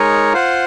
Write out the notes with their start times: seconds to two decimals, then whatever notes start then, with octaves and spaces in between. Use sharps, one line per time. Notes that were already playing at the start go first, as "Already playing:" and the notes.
Already playing: G#3 D#4 A#4 C#5
0.33 F4 C5 F#5